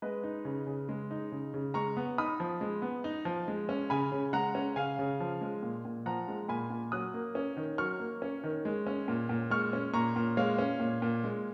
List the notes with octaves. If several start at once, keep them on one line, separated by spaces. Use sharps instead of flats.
G#3 B4 D#5
D#4
C#3
C#3
G#3
D#4
C#3
C#3
G#3 A#5 C#6
B3
D#4 B5 D#6
F3
G#3
B3
D#4
F3
G#3
C#4
C#3 G#5 B5
C#3
G#3 F#5 A#5
C#4
C#3 F5 G#5
C#3
F3
G#3
A#2
A#2
F3 F#5 A#5
G#3
A#2 G#5 B5
A#2
F#3 D#6 F#6
A#3
C#4
D#3
F#3 C#6 F6
A#3
C#4
D#3
G#3
C#4
A#2
A#2
G#3 C#6 F6
C#4
A#2 A#5 C#6
A#2
G#3 C#5 F5
C#4
A#2
A#2
G#3